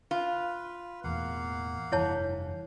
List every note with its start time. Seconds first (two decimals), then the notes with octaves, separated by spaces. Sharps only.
0.11 F4 B4
1.04 E1 E2 A2 A#3 F5 F#5
1.92 F1 G2 E3 E4 C#5 A5